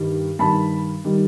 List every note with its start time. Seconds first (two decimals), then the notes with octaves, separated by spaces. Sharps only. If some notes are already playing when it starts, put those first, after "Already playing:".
Already playing: G2 D#3 G3
0.39 G2 D#3 G3 A5 B5
1.05 D#3 G3